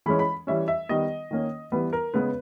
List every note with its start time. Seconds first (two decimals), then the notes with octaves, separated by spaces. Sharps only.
0.06 E3 G#3 C#4 B5
0.19 B5
0.47 E3 G3 C#4 E5
0.68 E5
0.89 D#3 G3 B3 D#5
1.31 D#3 A#3 C#4
1.72 E3 G3 B3 B4
1.93 A#4
2.14 C#3 G#3 B3 B4